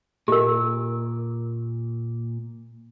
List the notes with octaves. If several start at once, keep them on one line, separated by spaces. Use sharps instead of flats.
A#2 G4 A#4